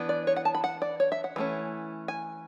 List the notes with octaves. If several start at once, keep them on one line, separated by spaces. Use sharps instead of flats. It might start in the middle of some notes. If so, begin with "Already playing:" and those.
Already playing: E3 B3 D4
D5
C#5
F#5
A5
B5
F#5
D5
C#5
E5
F#5
E3 A3 C#4
G#5